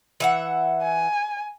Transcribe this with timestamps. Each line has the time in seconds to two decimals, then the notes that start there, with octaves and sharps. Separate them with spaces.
0.20 E3 E5 F#5
0.82 G#5